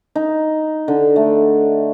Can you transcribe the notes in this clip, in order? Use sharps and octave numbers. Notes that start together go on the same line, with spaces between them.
D#4
D3
A3